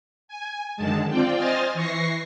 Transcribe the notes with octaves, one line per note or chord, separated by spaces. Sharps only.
G#5
F#2 D3 D#3 G#3 A5
C4 F4 D5 G5
C5 D#5 G#5 C6 F6 A6
E3 C#6 A#6 C7